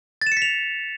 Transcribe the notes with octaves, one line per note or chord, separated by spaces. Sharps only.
A6
E7
C#7
B6
F7